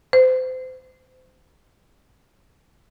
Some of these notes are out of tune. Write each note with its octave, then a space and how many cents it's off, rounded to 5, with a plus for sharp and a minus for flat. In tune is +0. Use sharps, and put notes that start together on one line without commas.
C5 -30